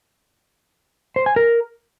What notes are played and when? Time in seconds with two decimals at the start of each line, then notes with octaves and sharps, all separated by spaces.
1.16 C5
1.26 G#5
1.36 A#4